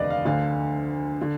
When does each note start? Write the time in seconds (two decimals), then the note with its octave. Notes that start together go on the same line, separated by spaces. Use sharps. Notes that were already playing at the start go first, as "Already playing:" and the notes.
Already playing: F1 D#2 D3 B4 D5 D#5 F5
0.10 F5
0.25 D2 D3 F5
1.21 D3